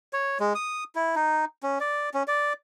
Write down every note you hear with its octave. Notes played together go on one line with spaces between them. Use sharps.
C#5
G#3
D#6
E4
D#4
C#4
D5
C#4
D5